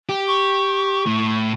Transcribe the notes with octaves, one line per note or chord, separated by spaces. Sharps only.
G4
C#6
A2